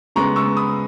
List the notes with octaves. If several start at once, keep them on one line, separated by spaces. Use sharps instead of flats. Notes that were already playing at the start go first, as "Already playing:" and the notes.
C#3 G#3 B3 A#5 C#6
C#6 E6
B5 D#6